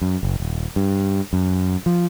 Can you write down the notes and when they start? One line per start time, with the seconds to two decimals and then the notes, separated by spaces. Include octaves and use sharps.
0.02 F#2
0.23 F#1
0.40 D#1
0.76 G2
1.33 F#2
1.86 F3